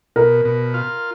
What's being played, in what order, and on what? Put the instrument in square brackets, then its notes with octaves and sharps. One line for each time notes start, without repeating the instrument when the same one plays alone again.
[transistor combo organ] B2 [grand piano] A#4
[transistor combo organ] B2
F4